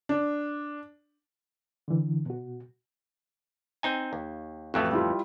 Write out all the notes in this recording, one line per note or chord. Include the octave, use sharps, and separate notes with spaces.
D4
D3 E3
B2 F#4
C4 D#4 G#5
D#2
A1 F2 A3 F#4
G3 E4 F4